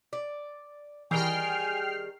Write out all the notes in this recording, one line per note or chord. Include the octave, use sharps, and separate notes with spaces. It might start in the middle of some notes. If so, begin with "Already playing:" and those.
D5
D#3 E3 G3 G#4 G5 G#5 F6 C7